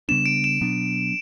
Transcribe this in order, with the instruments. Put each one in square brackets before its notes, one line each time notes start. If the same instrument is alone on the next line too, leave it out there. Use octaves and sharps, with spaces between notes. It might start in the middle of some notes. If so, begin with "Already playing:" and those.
[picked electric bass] C#3 G3 B3 D4 [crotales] E7
[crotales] D7
E7
[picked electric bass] B2 F#3 B3 D4